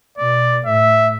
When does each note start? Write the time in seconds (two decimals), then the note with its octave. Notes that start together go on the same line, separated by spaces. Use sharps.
0.18 B2 D5
0.66 A2 E5